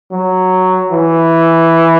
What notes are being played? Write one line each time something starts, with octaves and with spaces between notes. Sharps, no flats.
F#3
E3